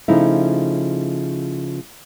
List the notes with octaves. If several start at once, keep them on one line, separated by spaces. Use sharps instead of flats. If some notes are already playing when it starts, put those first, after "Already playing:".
C#3 F3 A3 D#4 E4